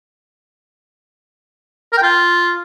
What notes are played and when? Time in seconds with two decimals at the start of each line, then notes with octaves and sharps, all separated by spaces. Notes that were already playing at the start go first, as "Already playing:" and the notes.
1.93 A#4
1.98 G5
2.03 F4